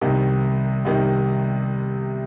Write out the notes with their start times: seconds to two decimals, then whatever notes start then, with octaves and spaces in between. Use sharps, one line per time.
0.01 C2 C3 D#3
0.85 C2 C3 D#3